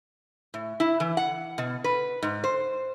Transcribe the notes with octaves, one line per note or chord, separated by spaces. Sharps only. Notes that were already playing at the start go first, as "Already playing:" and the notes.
A2
E4
E3
F#5
B2
B4
G#2
C5